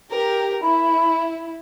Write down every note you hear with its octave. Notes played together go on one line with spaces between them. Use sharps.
G4 A#4
E4 B5